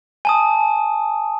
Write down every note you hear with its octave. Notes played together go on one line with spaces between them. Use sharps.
G#5 A5 D#6